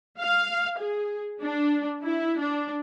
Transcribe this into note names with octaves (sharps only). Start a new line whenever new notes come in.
F5
G#4
D4
E4
D4